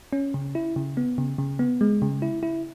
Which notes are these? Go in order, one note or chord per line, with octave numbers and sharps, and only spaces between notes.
C#4
C#3
E4
C#3
B3
C#3
C#3
B3
G#3
C#3
E4
E4